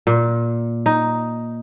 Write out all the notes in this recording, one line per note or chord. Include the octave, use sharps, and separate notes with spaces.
A#2
D#4